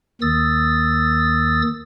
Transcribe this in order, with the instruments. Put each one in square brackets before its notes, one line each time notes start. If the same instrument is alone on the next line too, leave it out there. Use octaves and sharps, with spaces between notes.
[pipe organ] D#2 D#3 D#6 E6 A6